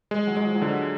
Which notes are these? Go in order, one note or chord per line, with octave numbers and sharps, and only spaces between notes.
G#3
F#3
G#3
F3
F#3
D3 F3